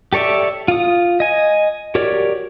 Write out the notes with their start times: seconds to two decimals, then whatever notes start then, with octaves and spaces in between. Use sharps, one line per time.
0.13 G4 A4 C#5 D5 E5
0.68 F4 D#6
1.20 D#5 G#5
1.95 F#4 G4 A#4 C#5 D5